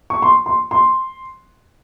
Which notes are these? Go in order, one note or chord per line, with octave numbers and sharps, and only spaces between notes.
C#6
C6
C6
C6